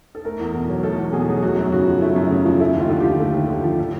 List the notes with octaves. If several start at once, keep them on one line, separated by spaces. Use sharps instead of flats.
A4
A3 A#4
E2
B2
F#3
A3 A4
E2
B2 G#4
F#3
A3 F#4
F#2
C#3 F#4
F3
A3 E4
F#2
C#3
F3
A3 E4
D#2
F4
D3
F3 G4
A3
D#2
D3
F3
A2